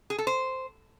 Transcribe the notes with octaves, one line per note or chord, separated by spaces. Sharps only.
G#4
A4
C5